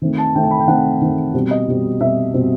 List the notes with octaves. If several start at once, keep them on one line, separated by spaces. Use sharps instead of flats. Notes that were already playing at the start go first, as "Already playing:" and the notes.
D#3 A3 C4
A5
D#3 A3 C4 G5
A5
B5
G5
D#3 A3 C4 F#5
D#3 A3 C4
B2 G3 C4
D#5
B2 G3 C4
B2 G3 C4 E5
B2 G3 C4